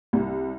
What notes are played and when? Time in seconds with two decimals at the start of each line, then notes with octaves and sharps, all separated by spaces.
0.13 C2